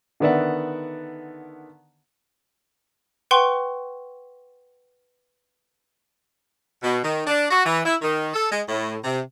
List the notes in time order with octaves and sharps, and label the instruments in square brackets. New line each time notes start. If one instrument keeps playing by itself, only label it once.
[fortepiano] D3 D#3 B3 D5 E5 F#5
[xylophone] B4 F#5 G5 C6 C#6 G7
[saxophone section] B2
D#3
D4
F#4
E3
E4
D#3
A4
G#3
A2
C3